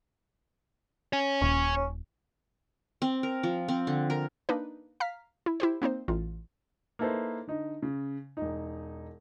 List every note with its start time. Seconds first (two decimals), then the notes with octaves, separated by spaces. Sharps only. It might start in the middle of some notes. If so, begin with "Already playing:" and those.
1.13 C#5 G#5
1.42 D#1 C#4
3.02 C4
3.23 A#4
3.43 F3
3.68 C4
3.87 D3
4.10 A#4
4.49 A#3 D4 D#4 B4
5.00 F5 A#5 F6 B6
5.46 E4
5.60 E4 G4 C5
5.82 A#3 C4 D#4 C5
6.08 A1 F4
6.99 A#3 D#4 E4 A4 B4 C5
7.47 D3 D#4
7.82 C#3
8.37 E1 D#4